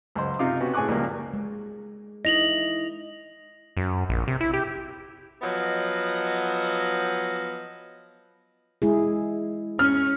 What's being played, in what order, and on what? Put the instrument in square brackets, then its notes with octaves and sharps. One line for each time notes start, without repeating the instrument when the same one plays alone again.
[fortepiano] C#2 F#2 C5 C6
C3 D#4 F4 F5 D6
B3 C#4 F#4 G4
A2 G#4 G#5 C#6 D6 F#6
C#2 A#2 F3 G3 A#3
[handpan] G#3
[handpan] D#4 E4 D#5 [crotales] A#6 F7 F#7
[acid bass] F#2
A#1
C3
E4
G4
[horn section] F3 F#3 B3 D#5
[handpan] G#3 E4 G#4
[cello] C#4 [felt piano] F6